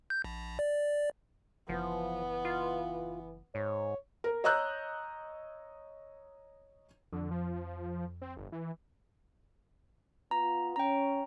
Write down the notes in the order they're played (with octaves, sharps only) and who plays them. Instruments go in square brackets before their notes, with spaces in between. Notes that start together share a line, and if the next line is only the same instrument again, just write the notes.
[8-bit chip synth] G6
A#1
D5
[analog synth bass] F#1 [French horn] E3 [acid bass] F3 [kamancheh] B3
[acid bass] F4
[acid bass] G#2 [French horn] C#5
[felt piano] A#4
C#5 D#5 A#5 E6 F#6 G6
[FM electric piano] F2 [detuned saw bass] D3
[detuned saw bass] F3
C4
G1
E3
[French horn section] B3 F4 [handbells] A#5
[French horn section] C#4 [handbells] G5 A#5